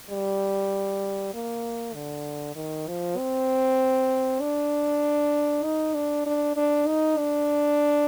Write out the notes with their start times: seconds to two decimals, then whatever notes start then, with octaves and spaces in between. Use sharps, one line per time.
0.10 G3
1.34 A#3
1.95 D3
2.56 D#3
2.88 F3
3.18 C4
4.41 D4
5.64 D#4
5.94 D4
6.26 D4
6.56 D4
6.87 D#4
7.17 D4